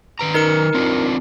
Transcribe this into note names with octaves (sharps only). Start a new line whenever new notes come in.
D#3 B4 A#5
D#4 A#4 C#7
C4 D4 F4